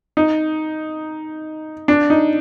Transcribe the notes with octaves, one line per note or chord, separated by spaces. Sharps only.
D#4
D4
D#4